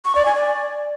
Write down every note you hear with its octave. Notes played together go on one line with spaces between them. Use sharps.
C#6
D5
G#5
D5